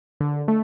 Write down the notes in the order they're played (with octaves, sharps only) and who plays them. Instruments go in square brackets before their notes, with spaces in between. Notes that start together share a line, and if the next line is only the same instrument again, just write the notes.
[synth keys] D3
A3